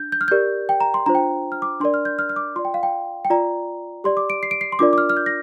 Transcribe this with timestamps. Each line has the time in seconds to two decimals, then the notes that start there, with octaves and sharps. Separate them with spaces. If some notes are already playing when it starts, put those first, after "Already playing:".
Already playing: D4 G6
0.12 G6
0.21 F6
0.28 G4 A#4 D5 G6
0.69 G5
0.80 A#5
0.94 C6
1.06 D4 F4 C5 A#5
1.15 G5
1.52 F6
1.62 D6
1.80 D4 A#4 D5 C6
1.94 F6
2.05 G6
2.19 F6
2.29 F6
2.36 D6
2.56 F4 D5 C6
2.65 G5
2.74 F5
2.83 G5
3.25 G5
3.30 F4 D5 A#5
4.04 G4 D5 C6
4.17 D6
4.30 D7
4.43 C7
4.51 D7
4.61 C7
4.72 C6
4.79 D4 F4 A#4 D5 D6
4.93 D6
4.98 F6
5.10 F6
5.17 G6
5.26 A#6